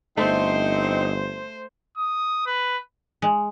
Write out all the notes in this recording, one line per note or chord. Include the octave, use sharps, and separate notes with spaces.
G1 A3 C4 D#4 C5
D#6
B4
G#3